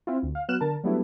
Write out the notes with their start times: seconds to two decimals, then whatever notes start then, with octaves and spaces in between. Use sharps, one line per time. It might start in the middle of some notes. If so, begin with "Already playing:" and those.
0.07 C4 E4 F4
0.23 D2
0.35 F5
0.48 F#3 B3 F#4 F6 F#6 E7
0.61 D3 A#4 A5
0.84 F#3 G3 A3 B3 D4 E4